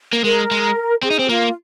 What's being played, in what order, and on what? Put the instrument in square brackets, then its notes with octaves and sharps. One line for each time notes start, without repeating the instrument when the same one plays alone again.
[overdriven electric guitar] A#3
[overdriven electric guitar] G#3 [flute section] A#4
[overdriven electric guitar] G#3
[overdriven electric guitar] C4 [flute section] G#4
[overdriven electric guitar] D#4
C4
[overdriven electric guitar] A#3 [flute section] F4